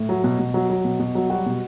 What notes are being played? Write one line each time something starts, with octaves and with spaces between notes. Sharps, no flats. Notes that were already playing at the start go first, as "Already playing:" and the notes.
Already playing: A2
F#3
B2
B2
F#3
F#3
B2
B2
F#3
G3 F#4
B2